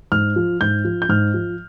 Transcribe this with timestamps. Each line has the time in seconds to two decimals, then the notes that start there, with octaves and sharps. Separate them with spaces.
0.12 G#2 F6
0.36 F3
0.61 G#2 G6
0.85 F3
1.02 G6
1.09 G#2 F6
1.34 F3